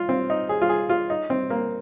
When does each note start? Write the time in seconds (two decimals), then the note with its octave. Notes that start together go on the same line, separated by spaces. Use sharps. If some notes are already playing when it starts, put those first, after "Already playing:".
Already playing: F4
0.09 C4
0.30 D#4
0.49 G#4
0.62 F4
0.69 G#4
0.89 F4
1.10 D#4
1.30 C4
1.50 A#3